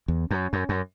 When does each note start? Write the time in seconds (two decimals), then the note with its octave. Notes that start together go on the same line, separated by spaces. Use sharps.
0.08 E2
0.31 F#2
0.53 F#2
0.69 F#2